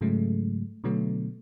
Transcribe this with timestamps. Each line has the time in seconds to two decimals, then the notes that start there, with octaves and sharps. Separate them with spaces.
0.01 G#2 C#3 F#3 G#3 A3
0.84 B2 D3 F#3 A3 B3